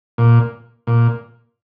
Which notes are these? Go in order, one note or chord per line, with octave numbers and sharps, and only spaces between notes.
A#2
A#2